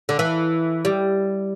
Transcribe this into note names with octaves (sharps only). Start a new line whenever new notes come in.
D3
E3
G3